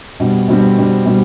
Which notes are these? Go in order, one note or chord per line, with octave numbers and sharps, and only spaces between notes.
B2 G3 C4
B2 G3 C4
B2 G3 C4
B2 G3 C4